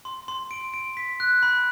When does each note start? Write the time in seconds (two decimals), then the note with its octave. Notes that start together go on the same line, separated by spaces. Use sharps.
0.05 C6
0.28 C6
0.51 D7
0.74 D7
0.97 B6
1.20 F#6
1.43 B5